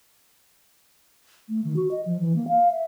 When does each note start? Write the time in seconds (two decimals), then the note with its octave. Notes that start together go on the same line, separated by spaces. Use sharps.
1.49 A3
1.64 D#3
1.76 F#4
1.91 D#5
2.06 F3
2.20 E3
2.36 A#3
2.48 F5
2.71 E5